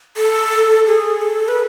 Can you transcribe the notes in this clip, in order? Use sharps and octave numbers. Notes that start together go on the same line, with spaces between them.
A4
G#4
A4
B4